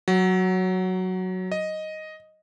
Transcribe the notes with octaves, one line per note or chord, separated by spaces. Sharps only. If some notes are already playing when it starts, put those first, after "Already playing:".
F#3
D#5